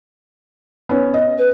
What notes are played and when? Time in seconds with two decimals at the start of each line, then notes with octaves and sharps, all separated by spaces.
0.89 B3 C#4
1.14 D#5
1.38 B4